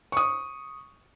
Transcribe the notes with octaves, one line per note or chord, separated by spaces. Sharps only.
C#6 D#6